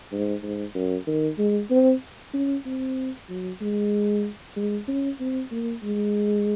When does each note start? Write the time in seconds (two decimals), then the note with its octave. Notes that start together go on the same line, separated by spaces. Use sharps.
0.12 G#2
0.43 G#2
0.75 F#2
1.07 D#3
1.39 G#3
1.71 C4
2.34 C#4
2.66 C4
3.29 F#3
3.61 G#3
4.57 G#3
4.88 C#4
5.20 C4
5.51 A#3
5.83 G#3